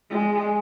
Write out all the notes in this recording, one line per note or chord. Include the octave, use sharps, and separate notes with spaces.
G#3